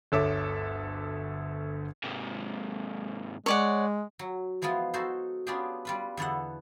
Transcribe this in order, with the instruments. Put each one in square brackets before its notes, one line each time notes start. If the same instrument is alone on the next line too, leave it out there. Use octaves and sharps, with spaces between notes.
[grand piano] G1 D2 A4 C#5 E5 D6
[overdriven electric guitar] G#2 C3
[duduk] G#3 [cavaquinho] C#5 D5 F#5
[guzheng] F#3
E3 F3 G#3 B3 F4
D#4 F#4 G#4 A4 C5
B3 C#4 D4 F4 G4 G#4
G3 F4 B4
E2 D3 B3 A4 F#5